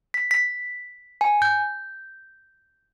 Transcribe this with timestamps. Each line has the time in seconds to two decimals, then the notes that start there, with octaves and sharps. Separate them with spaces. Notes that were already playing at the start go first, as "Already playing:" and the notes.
0.14 B6
0.31 B6
1.21 G#5
1.42 G6